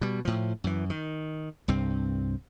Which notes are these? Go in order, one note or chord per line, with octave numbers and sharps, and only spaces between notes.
B2 G3
A2 F3
F#2 E3
D#3
C2 G2 C4